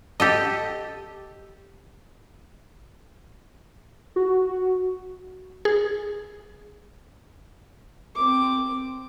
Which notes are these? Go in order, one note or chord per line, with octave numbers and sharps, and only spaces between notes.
G4 A4 D#5
F#4
G#4
C4 D6